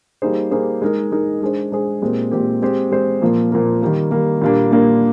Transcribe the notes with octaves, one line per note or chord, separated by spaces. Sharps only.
G3 A#3 D#4 G#4 C5
G3 A#3 D#4 G#4 C5
G#3 D#4 A#4
G#3 D#4 A#4
G#3 D4 G#4 C5
G#3 D4 G#4 C5
A#2 G#3 C4 G4 A#4
A#2 G#3 C4 G4 A#4
G#3 C4 G4 C5
G#3 C4 G4 C5
A#2 F3 A#3
A#2 F3 A#3
D#3 G3 A#3
D#3 G3 A#3
A#2 G3 A#3 D4
A#2 G3 A#3 D4